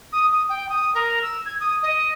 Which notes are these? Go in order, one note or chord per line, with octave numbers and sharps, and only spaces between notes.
D#6
D#6
G5
D#6
A#4
E6
G#6
D#6
D#5